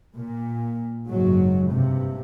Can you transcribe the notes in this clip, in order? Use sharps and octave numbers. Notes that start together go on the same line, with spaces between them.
A#2
F#1 G#2 F#3
G2 C3